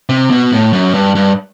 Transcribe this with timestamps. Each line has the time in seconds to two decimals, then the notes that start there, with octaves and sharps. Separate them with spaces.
0.09 C3
0.30 B2
0.52 A2
0.73 F#2
0.94 G2
1.15 G2